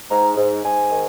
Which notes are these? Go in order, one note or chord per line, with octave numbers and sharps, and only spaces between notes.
G#2 A#5
G#2
G#2 G#5
D#3